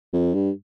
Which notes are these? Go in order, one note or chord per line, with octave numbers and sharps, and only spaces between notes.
F2
G2